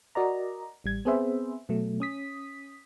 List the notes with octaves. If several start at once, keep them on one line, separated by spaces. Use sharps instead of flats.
F#4 A#4 D5 D#5 A#5
A1 G3 G#6
B3 C4 G#4 B4 C5 E5
B2 F#3 A3
C#4 D#6 B6